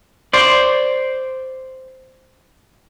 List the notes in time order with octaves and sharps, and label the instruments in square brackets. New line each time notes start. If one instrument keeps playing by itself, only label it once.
[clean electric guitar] C5 D5